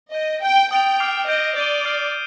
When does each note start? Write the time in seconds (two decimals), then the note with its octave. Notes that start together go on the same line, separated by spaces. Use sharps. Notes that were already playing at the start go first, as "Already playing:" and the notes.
0.14 D#5 G6 D7 G7
0.43 G5 G6 D7 G7
0.71 G5 D#6 A6 D7 F7
0.99 D6 F6 C7 F7
1.28 D#5 G6 D7 G7
1.57 D5 G6 C7 D#7 G7
1.85 D6 F6 C7 G7